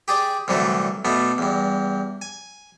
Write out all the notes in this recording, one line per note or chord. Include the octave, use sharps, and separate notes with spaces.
G4 G#4 D5
C2 D3 E3 F#3 A3
B2 A3 B3 D4
E2 G2
G#5